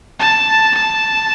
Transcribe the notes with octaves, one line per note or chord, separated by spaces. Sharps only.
A5
A5